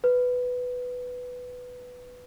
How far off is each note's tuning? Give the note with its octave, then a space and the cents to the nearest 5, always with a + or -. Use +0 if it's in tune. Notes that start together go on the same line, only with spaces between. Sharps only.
B4 +5